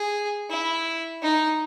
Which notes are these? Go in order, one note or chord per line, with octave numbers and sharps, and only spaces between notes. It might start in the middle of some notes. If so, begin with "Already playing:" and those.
Already playing: G#4
E4
D#4